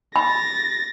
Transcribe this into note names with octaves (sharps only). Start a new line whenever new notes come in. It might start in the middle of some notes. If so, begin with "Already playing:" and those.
B5 A6 A#6